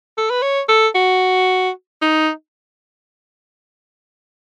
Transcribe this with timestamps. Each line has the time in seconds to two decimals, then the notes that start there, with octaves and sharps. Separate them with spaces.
0.18 A4
0.30 B4
0.42 C#5
0.69 A4
0.95 F#4
2.02 D#4